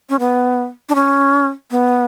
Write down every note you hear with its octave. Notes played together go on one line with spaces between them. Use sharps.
C#4
B3
D4
C#4
B3